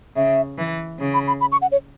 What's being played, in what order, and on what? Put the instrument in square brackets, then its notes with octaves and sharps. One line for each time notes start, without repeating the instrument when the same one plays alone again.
[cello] C#3 [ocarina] E5
[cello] E3
C#3
[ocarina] B5
B5
B5
C#6
F#5
C#5